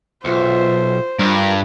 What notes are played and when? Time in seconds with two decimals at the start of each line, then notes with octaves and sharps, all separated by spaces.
0.25 B1 F4 C5 E5
1.19 G2 F4 A#4